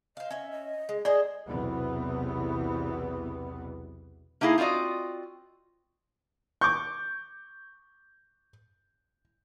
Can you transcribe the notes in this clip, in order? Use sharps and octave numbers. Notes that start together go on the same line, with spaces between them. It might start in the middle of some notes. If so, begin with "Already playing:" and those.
C5 D#5 F5
C#4 E5
D#5
G#3
G#4 C5 D5 D#5
B1 E2 C3 E3 B3
A#3 D#4 E4 G#4 F5
C4 F4 F#4 D5 D#5
C#6 D6 G6